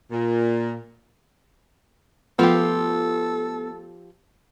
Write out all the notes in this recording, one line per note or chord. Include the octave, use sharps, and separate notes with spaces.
A#2
F3 A3 B3 F4 G4 A4